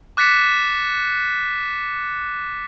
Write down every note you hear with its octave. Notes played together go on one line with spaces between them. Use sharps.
D6 F#6 A6 B6 C#7 E7